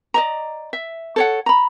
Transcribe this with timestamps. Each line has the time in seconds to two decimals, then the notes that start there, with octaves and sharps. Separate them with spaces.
0.14 D5 D#5 A#5
0.73 E5
1.16 A4 C#5 F#5
1.46 A#5 B5